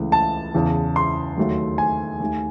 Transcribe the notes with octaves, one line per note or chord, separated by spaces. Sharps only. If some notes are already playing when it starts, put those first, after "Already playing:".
Already playing: C#2 C#3 E3 A3
A5
E2 C#3 E3
C6
D#2 D#3 F#3 A3
G#5
D#2 D#3 A3